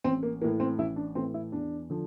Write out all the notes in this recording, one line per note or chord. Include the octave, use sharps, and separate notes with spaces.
A1 C4
A#3
A2 E3 A#3
C4
A1 E4
D4
A2 E3 C4
E4
E2 D4
D3 F3